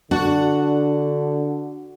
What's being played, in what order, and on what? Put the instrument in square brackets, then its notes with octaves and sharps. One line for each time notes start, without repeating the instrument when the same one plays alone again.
[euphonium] D3 [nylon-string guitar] D4 [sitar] F#4